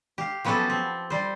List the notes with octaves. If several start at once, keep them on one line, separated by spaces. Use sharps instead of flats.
G4 F5
F3 F#3 B3 C#4 G4 A4
C4
G3 C5